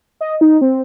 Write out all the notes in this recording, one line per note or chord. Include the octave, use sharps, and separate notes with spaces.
D#5
D#4
C4